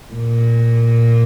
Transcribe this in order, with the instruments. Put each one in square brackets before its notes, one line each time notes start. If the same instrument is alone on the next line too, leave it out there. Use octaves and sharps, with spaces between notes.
[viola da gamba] A#2